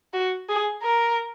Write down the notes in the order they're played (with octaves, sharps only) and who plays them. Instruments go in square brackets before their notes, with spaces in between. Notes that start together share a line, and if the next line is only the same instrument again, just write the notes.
[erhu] F#4
G#4
A#4